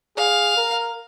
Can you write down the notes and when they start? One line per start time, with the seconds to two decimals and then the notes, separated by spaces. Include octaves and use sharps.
0.17 G#4 F5
0.57 A#4